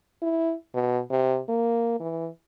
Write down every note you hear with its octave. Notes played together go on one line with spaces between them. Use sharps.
E4
B2
C3
A#3
E3